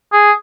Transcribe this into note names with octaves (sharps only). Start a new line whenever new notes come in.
G#4